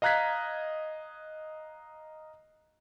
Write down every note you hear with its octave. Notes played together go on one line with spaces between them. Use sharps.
D#5 F5 A#5 F#6 G#6 B6